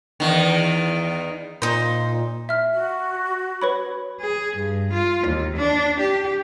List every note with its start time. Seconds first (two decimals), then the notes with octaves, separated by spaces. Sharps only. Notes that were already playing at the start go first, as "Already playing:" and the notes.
0.20 E2 D#3
1.62 A#2 D#4 C5
2.49 E5 F6
2.71 F#4
3.62 B4 C#5 B5
4.21 G#4
4.57 G2
4.93 F4
5.27 D#2
5.57 D4
6.00 G4